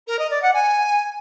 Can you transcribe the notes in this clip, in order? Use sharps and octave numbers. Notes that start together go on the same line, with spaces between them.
A#4
D#5
D5
F#5
G#5